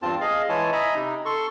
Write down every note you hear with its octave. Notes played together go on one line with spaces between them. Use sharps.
E2 G2 C4 F4 A5
G#4 D#5 F5
E3 G#3 E4 C#5 G#5 A5
D#5 E5 G#5 A#5 B5
C3 D#4
A4 C6 C#6